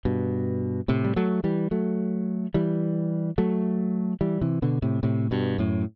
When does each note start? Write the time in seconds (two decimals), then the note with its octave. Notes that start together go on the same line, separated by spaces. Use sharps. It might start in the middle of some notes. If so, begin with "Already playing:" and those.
0.05 G2 B2
0.88 A2 C3
1.04 G3
1.16 F#3 A3
1.44 E3 G3
1.71 F#3 A3
2.54 E3 G3
3.38 F#3 A3
4.21 E3 G3
4.41 C3 E3
4.62 B2 D3
4.82 A2 C3
5.03 A2 C3
5.31 G2 B2
5.58 F#2 A2